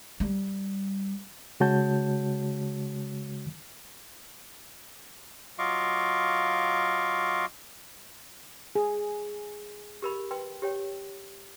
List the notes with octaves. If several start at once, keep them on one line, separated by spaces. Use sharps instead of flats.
G3
C#3 G#3 F#4 C#5 A5 G6
F#3 F4 D#5 F5 C#6 D6
G#4
G4 A#4 B5
B4 G5 C6
G4 C#5 G5